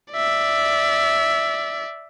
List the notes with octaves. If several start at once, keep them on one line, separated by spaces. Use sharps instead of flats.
D5 E5